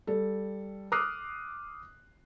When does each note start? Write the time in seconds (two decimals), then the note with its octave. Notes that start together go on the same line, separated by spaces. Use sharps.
0.07 G3 A4
0.92 D6 D#6 F6 F#6 C7